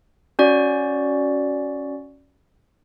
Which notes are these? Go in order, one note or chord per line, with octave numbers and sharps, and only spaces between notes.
C#4 F#4 D5